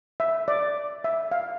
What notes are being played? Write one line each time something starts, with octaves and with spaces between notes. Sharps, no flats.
E5
D5
E5
F5